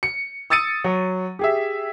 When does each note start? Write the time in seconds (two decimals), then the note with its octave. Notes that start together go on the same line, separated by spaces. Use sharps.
0.03 C#7
0.50 D#6 E6 A6 C#7 D#7
0.84 F#3
1.39 G4 G#4 E5